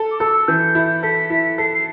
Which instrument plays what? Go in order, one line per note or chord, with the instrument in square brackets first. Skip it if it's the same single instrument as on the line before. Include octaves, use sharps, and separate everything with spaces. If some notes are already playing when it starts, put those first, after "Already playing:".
Already playing: [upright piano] A4
[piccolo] D6
[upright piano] A4 [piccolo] E6
[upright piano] E3 [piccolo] G6
[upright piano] E4
[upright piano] A4 [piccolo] B6
[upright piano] E4 [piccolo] B6
[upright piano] A4 [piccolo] C7
[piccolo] C7